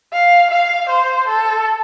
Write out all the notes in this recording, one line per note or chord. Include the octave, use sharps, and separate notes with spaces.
F5
F5
C5
A4